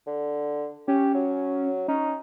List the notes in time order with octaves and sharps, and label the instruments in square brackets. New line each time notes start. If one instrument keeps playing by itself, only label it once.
[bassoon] D3
[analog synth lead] C#4 [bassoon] G4
[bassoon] F#3
[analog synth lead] C#4 [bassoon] D#4